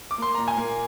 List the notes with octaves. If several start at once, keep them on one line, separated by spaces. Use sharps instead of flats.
D6
A#3 C6
A#2 A#5
G#5
A#3